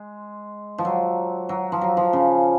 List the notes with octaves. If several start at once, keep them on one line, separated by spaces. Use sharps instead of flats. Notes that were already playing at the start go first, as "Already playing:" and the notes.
Already playing: G#3
F3
F#3
F#3
F3
F#3
F3
C#3